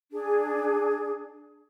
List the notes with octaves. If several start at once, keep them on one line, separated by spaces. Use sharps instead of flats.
D4 G#4